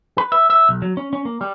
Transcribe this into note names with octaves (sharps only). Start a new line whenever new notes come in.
B4
E5
E5
B1
F#3
C#4
C#4
A#3
G3